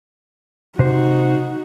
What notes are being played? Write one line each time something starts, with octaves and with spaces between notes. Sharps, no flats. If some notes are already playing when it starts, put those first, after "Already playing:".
C3 D#4 F#4 C5